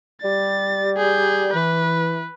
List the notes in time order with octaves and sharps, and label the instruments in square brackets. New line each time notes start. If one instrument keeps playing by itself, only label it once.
[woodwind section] G3 D5 [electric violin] A6
[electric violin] G#4 G6
[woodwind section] E3 [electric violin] B4